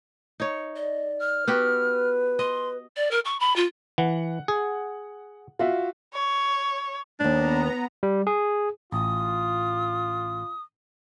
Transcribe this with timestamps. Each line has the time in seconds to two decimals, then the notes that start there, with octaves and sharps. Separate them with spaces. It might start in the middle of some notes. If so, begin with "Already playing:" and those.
0.40 D#4 C#5
0.76 D5 D#5
1.20 F6
1.48 B3 F#4 G4 B4
2.39 D#5 C6
2.96 D5
3.11 A#4
3.25 C#6
3.40 B5
3.56 F4
3.98 E3 F#5
4.48 G#4
5.59 F4 F#4 E5
6.13 C#5
7.20 D#2 G#2 B3 D4 A#5
8.03 G3
8.27 G#4
8.92 A1 F4 D#6